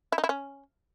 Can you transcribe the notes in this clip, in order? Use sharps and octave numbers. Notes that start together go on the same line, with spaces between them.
E4
D#4
E4
C#4